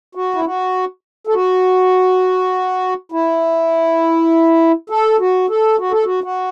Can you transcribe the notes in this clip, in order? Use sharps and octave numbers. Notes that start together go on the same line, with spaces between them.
F#4
E4
F#4
A4
F#4
E4
A4
F#4
A4
F#4
A4
F#4
F#4